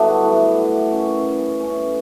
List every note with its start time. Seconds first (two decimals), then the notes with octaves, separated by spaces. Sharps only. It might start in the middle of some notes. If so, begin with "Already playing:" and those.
Already playing: G2 D3 F#3 B3 D4 E4 F#4
0.24 A2 E3
0.92 F#2 E3 C#4
1.60 A2 E3 C#4